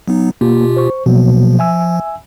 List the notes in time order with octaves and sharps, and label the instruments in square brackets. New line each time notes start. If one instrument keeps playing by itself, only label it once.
[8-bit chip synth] F#3 B3 D#4
[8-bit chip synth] B2 F4 G4 [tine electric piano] A#3
[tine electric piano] C5 C#6
[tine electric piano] B2 F#3 A#3 [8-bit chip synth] F3
[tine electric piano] E5 G#5 E6